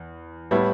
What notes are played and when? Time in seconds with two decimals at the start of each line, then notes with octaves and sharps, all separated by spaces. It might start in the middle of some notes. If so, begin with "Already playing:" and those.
Already playing: E2
0.51 A2 G3 B3 E4